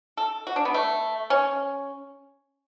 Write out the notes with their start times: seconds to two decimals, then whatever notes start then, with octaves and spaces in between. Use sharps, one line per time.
0.17 A4
0.47 F#4
0.56 D4
0.65 B3
0.74 A3
1.30 C#4